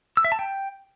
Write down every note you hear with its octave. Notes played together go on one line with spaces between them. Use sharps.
E6
E5
A5
G5